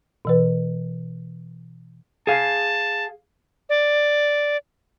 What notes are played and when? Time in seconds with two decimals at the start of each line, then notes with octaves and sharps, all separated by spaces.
0.25 B2 E3 B4
2.27 G#4 F5 A5
3.69 D5